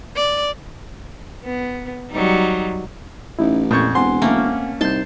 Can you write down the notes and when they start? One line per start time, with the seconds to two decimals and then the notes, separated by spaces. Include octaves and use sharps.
0.16 D5
1.44 B3
2.11 F#3 G3 D#4
3.39 A1 C#4 D#4 E4
3.71 F2 A#2 C#6 G6 G#6
3.95 E1 C4 F#5 G#5 C6
4.22 A3 A#3 C#4
4.81 C2 D#4 A5 C6 G6